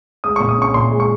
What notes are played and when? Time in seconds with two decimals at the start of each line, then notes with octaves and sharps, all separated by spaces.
0.24 G#3 D#6
0.36 A#2 C#6
0.49 D#6
0.57 C#4 C#6
0.74 A#2 C6
0.91 G#3
1.00 C#6